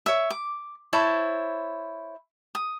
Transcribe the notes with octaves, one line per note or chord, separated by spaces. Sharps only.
C#5 E5
D6
E4 C5 C#5 A5
D#6